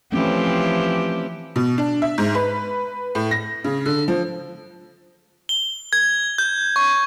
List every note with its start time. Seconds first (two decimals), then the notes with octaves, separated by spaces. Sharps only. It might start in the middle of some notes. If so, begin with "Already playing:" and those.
0.12 E3 F3 A3 C4 C#4 G4
1.56 B2
1.78 D4
2.02 E5
2.18 G#2
2.35 B4
3.15 A2
3.31 A#6
3.64 C#3
3.85 D3
4.08 F3
5.49 G7
5.93 G#6
6.38 G6
6.76 C#6